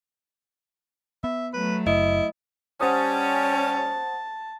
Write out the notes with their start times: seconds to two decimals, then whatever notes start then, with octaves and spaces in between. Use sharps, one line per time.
1.24 B3 E5
1.53 F#3 A3 B4
1.87 F#1 E4 D#5
2.81 G3 C#4 C5 F#5 A5 D#6